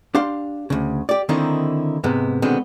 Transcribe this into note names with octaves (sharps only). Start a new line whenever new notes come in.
D4 G4 F5 C6
D2 C#3
G4 D5
D3 D#3 A#3 C4 D#4 E4
G#2 C3 G#3 B3
B2 D3 D#3 G#3 B3 C4